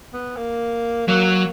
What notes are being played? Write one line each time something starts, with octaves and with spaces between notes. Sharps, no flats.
B3
A#3
F#3 A#3
A#3